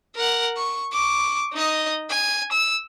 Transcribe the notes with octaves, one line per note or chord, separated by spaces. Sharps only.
A#4 F#5
C#6
C#6 D6
D#4 D#5
G#5
E6